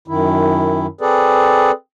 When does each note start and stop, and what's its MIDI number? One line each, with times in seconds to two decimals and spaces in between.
0.08 0.87 42
0.08 0.87 51
0.08 0.87 64
1.01 1.71 60
1.01 1.71 68
1.01 1.71 69
1.01 1.71 71
1.01 1.71 74